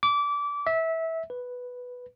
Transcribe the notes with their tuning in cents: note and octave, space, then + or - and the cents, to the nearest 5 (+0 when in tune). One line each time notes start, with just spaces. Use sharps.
D6 -25
E5 -20
B4 +0